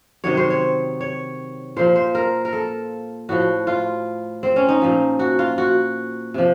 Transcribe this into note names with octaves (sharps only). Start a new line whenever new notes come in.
C3 D#3 F#3 C#5
C5
C#5
C#5
A#2 F3 C5
C5
A#4
A#4
A4
A2 F3 F#4
F4
C4
C#4
D#4
A#2 F3
F#4
F4
F#4
C3 F3